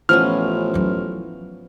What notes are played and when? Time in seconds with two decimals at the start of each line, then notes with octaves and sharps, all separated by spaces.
0.09 A1 F3 B3 C#4 F6
0.74 F#3 D#4